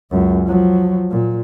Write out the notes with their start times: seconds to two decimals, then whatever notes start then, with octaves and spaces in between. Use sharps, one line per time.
0.11 C#2 F#2
0.46 F3 F#3
1.11 A#2